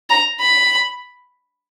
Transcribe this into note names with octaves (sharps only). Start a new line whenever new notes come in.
A#5
B5